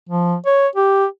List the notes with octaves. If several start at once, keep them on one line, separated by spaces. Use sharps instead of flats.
F3
C#5
G4